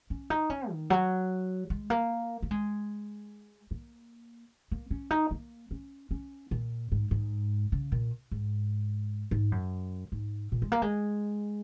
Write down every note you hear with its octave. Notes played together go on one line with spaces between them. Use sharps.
C#4
D#4
C#4
D#3
F#3
G#3
A#3
A#3
G#3
A#3
A#3
C#4
D#4
A#3
C#4
C#4
A#2
G#2
G#2
C#3
A#2
G#2
G#2
F#2
G#2
A#2
G#3
A#3
G#3